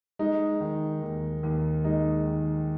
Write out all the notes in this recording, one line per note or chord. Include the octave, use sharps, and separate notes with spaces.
G#3 D#4
D#3
D#2
D#2
G#3 D#4
D#3